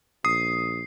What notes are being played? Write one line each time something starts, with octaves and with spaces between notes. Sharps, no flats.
A#1 D#6 C7